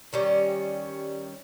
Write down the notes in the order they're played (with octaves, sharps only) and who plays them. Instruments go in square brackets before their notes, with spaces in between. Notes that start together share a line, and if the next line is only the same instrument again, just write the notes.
[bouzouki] D#3 G3 C#4